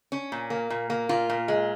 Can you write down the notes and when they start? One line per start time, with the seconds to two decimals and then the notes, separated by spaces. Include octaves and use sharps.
0.12 C#4
0.32 A#2
0.50 A#3
0.70 A#2
0.90 A#3
1.09 A#2 F4
1.30 A#2
1.48 G#3